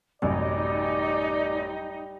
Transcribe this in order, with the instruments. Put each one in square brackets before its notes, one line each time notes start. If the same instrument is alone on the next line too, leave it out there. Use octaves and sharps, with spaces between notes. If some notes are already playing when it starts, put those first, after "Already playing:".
[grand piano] A1 F#2 C3 [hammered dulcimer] G3 [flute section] D#4 [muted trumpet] D5